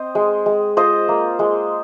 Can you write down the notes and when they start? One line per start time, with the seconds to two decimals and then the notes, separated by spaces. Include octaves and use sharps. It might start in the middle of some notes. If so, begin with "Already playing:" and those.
Already playing: C4 C5 D#5
0.15 G#3
0.46 G#3
0.77 F4 C5 D#5
1.09 A#3
1.39 G#3